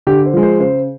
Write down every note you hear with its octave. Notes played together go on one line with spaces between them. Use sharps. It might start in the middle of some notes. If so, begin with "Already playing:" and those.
D3 G4
C5
F3 G#3
C5
C#3 C5